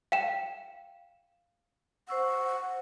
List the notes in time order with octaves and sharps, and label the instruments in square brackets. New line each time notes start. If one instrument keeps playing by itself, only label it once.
[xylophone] F5 G5 E7
[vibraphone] C5 C#6 E6 [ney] F#5